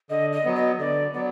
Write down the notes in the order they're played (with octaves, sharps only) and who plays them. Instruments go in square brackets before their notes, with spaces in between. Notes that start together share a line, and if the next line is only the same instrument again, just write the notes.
[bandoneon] D3 [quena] D#5
[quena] D#5
[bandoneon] F#3 B3
[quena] D#5
[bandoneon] D3 [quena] D5
[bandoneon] F#3 B3 [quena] D5